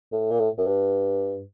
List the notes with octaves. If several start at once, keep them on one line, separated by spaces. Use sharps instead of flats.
A2
A#2
A2
F#2
G2